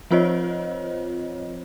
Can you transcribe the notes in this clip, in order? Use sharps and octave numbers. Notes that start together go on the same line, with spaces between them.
F3 C4 F4 C5 C#5 D#5